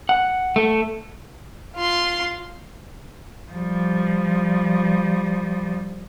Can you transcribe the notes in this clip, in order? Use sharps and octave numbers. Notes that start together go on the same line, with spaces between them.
F#5
A3
F4 C6
F3 G3